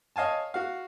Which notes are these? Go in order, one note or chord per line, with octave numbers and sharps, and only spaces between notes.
C#5 D#5 F5 G#5 A5
F#4 F5